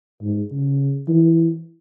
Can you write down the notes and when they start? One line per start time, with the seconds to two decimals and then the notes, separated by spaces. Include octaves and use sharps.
0.22 G#2
0.52 C#3
1.09 E3